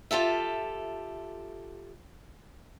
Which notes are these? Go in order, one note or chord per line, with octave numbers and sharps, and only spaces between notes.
F4 G4 A4 E5